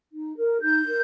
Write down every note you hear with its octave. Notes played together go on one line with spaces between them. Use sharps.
D#4
A#4
D#4 G6
A#4